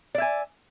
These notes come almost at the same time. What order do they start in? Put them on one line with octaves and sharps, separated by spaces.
D5 E5 G#5